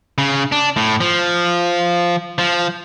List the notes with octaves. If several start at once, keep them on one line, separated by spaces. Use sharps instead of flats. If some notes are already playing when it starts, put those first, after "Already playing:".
C#3
D4
A2
F3
F3